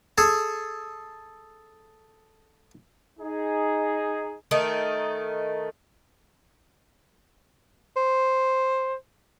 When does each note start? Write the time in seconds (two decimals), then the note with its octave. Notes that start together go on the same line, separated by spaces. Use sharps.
0.18 G#4 A4
3.20 D#4 G#4
4.51 D#3 A3 D#4
7.97 C5